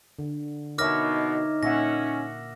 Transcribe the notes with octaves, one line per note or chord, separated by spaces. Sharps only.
D3
B2 D#4 A#4 C#5 E5 D6 F6 A#6
A#2 C#4 E5 F#5 A#6